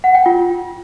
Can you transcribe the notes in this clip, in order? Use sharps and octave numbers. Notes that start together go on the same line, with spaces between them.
F#5
G5
F4